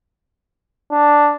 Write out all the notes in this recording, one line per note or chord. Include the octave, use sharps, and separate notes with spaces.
D4